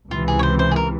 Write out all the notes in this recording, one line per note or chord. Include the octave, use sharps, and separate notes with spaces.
C#2 C3 E3 F4
G#4
C#5
C5
C5
G#4
A#4